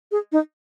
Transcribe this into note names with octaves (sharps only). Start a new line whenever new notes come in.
G#4
D#4